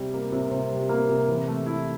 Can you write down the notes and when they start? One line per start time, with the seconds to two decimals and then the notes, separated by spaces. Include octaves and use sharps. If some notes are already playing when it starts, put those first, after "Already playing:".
Already playing: C3 G3
0.13 A#3
0.32 C3
0.51 C3
0.71 G3
0.89 A#3
1.08 C3
1.28 E3
1.47 A3
1.66 E4